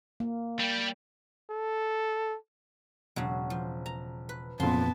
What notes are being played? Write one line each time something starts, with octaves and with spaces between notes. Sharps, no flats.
A#3
G3 G4
A4
E1 C#3 F#3
F3
A#5
B4
F2 A#2 C#3 E3 B3 A5 C6